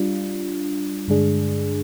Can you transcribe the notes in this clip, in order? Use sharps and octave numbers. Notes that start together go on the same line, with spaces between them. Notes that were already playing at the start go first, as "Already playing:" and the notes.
Already playing: G3 D4 F4
G2 D3 G#3 D4 G#4